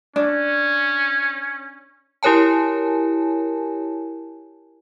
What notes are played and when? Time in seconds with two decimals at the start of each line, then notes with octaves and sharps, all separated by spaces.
0.16 C#4 D4
2.23 E4 G4 A#4 C#5 G#5 A5